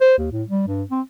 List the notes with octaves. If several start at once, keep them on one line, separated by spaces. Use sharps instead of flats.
C5
D#2
A2
G3
G2
C4